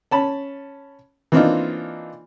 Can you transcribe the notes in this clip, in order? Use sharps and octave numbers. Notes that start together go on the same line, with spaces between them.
C#4 A5 B5
E3 A#3 C4 D4 D#4 F4